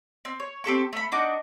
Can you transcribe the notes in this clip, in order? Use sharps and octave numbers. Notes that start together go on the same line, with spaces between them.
C4
C#5
C4 G4 A4 C#6
A3 B5
D4 D#4 F#4 D6